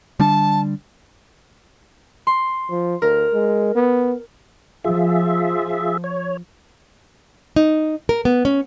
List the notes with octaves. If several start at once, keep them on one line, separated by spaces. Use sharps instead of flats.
D3 G3 D4 A5
C6
F3
D2 A#4
G#3
B3
F3 F4 G#4 E5
C#5
D#4
A#4
B3
C#4